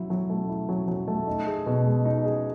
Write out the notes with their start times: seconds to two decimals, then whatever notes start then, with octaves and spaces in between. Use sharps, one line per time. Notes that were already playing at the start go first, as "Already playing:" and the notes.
Already playing: F#3 E4
0.10 F#3
0.30 A3
0.49 E4
0.69 F#3
0.88 F#3
1.08 A3
1.27 D#4
1.47 G#4
1.66 B2
1.85 G#3
2.05 D#4
2.25 G#4